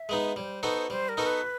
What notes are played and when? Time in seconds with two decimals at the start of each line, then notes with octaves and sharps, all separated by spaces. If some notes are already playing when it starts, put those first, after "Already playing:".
Already playing: E5
0.09 G#3 B3 D#4
0.36 G3 C#5
0.41 C5
0.63 B3 D#4 F#4 A4
0.90 G3 C5
1.09 A#4
1.17 B3 D#4 F#4 A4
1.27 B4